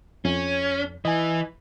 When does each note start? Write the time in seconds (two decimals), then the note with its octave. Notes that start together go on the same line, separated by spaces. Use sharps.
0.25 F2 C#4
1.05 E3 D#5 G#5